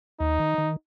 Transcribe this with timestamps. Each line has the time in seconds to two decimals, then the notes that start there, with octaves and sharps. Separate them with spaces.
0.20 D#2 D#4
0.40 D#3
0.58 D#3